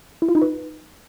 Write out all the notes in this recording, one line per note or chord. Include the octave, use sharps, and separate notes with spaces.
E4
F4
D#4
B4